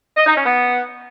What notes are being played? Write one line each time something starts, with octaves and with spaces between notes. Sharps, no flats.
D#5
D#4
C#4
B3